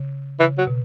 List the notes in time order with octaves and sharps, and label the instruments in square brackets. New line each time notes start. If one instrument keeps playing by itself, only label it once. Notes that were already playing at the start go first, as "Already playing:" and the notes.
Already playing: [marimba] C#3
[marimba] C#3 [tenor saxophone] E3
[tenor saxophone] F#3
[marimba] B2